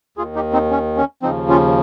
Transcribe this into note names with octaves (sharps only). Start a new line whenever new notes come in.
D#2 D#3 F4 G#4
D#4 G4
C4 D#4
C#4
C#4
D#2 C#3 F3 C4 D#4
C#4 F4